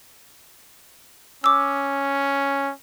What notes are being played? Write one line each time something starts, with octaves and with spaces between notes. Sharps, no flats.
C#4 D6 E6